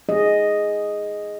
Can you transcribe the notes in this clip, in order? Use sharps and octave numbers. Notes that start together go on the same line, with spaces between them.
G#4 D#5